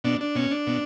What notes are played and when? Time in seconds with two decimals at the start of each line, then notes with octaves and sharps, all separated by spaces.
0.04 B2 D4
0.21 D4
0.35 B2 C#4
0.51 D4
0.67 B2